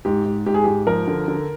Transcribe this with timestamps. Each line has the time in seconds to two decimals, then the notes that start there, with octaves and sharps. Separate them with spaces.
0.05 G#2 G4
0.26 G#2
0.46 G#2 G4
0.54 G#4
0.64 G#2 G4
0.87 F3 A#4
1.07 D3
1.28 D3